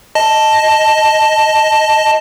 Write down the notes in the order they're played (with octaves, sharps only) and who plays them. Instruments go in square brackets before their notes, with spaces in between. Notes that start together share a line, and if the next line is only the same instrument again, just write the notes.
[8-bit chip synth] D#5 A5